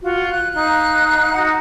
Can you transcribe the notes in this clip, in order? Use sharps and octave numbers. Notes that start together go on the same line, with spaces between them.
F4 F#4
F#6
D#4 F5 F#6
D#4 F#4 F#5